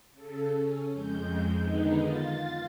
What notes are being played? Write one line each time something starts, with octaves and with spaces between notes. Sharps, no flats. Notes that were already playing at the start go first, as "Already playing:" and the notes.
C#3 A4
C#4
F2 G#3 G6
D3 D#3 G#3 B3 D#4
F4 A6